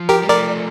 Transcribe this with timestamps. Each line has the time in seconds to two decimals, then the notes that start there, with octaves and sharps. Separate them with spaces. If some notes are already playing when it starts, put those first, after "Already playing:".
Already playing: F3
0.09 G4 A#4
0.22 G3
0.29 F3 A3 A#4 D5